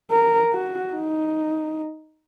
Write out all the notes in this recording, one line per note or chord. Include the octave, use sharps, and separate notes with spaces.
A#4
F#4
D#4